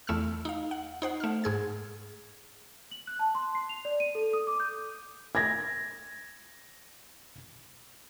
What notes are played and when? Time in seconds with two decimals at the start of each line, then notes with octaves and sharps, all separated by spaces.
0.07 E2 A3 E6 F6
0.45 D#4 F5
0.71 F#5
1.02 D#4 C5 F#5
1.20 A3 F6
1.44 G#2 G#4 G#6
2.91 F#7
3.07 F#6
3.19 A5
3.35 C6
3.55 C7
3.69 F7
3.85 D5
4.00 D#7
4.15 A4
4.33 D#6
4.47 D6
4.60 G6
5.35 G#6 A#6